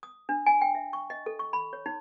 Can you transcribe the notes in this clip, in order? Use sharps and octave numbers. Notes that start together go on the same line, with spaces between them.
D#6
D4
G#5
G5
E5
C#6
D#5
A4
C#6
B5
C#5
D#4